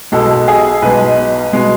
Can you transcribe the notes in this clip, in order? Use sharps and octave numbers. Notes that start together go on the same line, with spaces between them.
B1 B2 G#3 A4
G#4
B1 B2 G#3 B4
B2 G#3